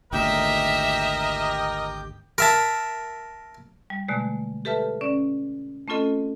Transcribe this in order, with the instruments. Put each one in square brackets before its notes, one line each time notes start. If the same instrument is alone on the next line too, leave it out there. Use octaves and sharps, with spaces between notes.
[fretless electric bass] G#1 D2 A#2 [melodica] G4 G5 [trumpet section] A#4 D#5 [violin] E5
[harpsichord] A#4 E5 A5
[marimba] G3
B2 D3 G#3 A3
G4 A4 B4 E5 A5 F6
C#4 D5
A3 C4 C#4 F4 A4 D#5